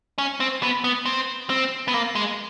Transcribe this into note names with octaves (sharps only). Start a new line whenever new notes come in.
C#4
C4
B3
B3
C4
C4
B3
A#3
G#3